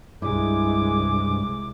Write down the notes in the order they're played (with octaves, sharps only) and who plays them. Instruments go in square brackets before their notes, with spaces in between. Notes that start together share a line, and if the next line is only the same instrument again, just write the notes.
[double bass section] C2 G#3 [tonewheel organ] G2 [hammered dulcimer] D#4 E4 [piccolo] D6